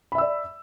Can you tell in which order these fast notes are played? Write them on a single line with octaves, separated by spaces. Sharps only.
B5 E5 E6 D5